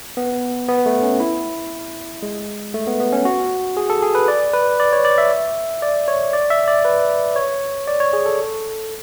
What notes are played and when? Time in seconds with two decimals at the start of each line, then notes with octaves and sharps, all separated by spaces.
0.17 B3
0.69 B3
0.86 A3
1.03 C#4
1.20 E4
2.22 G#3
2.74 A3
2.87 B3
3.00 B3
3.12 C#4
3.25 F#4
3.77 G#4
3.90 A4
4.02 G#4
4.15 B4
4.28 D5
4.54 B4
4.80 D5
4.93 C#5
5.05 D5
5.18 E5
5.82 D5
6.08 C#5
6.33 D5
6.50 E5
6.68 D5
6.85 B4
7.36 C#5
7.87 D5
8.00 C#5
8.13 G#4
8.26 A4